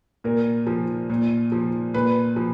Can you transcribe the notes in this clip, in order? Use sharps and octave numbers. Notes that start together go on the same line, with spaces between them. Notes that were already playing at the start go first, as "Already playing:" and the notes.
A#2 A#4
F3
A#2
F3
A#2 B4
F3